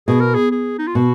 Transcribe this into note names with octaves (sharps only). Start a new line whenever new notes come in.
B2 G#4
A#4
G#4
G#4
D#4
F4
B2 F#4